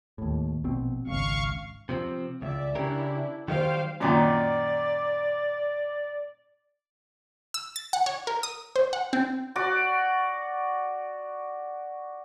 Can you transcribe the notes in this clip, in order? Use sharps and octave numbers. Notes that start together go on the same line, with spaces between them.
D#2 A2
A#1 B2 C4
G#1 C#2 F5 C#6
C3 F3 C4
C#2 D5 E5
C#3 D4 E4 G4 A#4
D#3 F#3 G3 C5 F5 G5
F#2 A#2 D#3 D5
E6
A6
F#5
C#5
A#4
D#6
C5
F#5
C4
F#4 D5